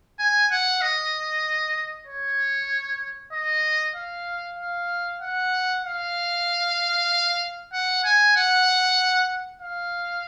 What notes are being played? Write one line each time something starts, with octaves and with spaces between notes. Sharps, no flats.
G#5
F#5
D#5
C#5
D#5
F5
F5
F#5
F5
F#5
G#5
F#5
F5